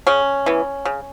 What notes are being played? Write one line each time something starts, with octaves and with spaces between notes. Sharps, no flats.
C#3 C#4
E3 B3
C#3